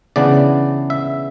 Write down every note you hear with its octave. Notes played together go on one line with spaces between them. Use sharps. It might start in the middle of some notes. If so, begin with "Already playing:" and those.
C#3 E3 B3 D4 D5
E5